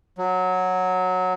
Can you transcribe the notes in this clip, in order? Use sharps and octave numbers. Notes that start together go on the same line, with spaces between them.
F#3